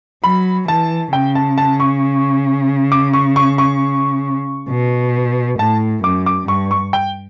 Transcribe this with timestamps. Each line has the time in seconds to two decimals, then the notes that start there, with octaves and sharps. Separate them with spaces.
0.24 F#3 B5
0.68 E3 A5
1.13 C#3 G5
1.35 A5
1.58 A5
1.80 C#6
2.92 D6
3.13 C#6
3.36 C#6
3.58 C#6
4.70 B2
5.59 A2 A5
6.04 F#2 D6
6.26 D6
6.48 G2 C#6
6.71 C#6
6.93 G5